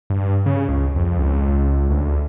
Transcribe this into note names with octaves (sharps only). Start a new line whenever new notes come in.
G2
C#3
C#2
F2
C#2
D2